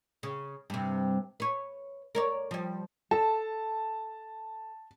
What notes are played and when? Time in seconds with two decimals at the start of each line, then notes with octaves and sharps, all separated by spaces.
0.23 C#3
0.70 G2 C3
1.40 B4 C#5
2.15 A#4 C#5 D5
2.51 F3 G3
3.11 A4 A5